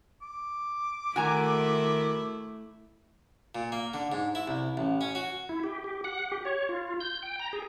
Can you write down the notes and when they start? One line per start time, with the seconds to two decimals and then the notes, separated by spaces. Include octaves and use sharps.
0.22 D6
1.16 D#3 A3 E4 F#4 G#5 A#5
3.55 A#2
3.72 A#3
3.94 D3
4.12 G#2
4.35 E4
4.48 C2
4.77 A1
5.01 C#4
5.15 F#4
5.49 E4
5.64 G4
5.84 G4
6.04 F#5
6.32 G4
6.45 C#5
6.69 F4
7.00 G6
7.23 G5
7.39 A#5
7.53 G#4